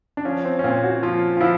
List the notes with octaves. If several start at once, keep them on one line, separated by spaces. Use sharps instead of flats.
D4
F3 C#4
C4
C#4
A#2 C4
F#4
F3 F4
F4
F3 E4